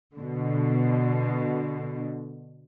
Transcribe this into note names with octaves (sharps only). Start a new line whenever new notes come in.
B2 D3